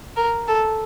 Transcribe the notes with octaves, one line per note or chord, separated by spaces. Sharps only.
A#4
A4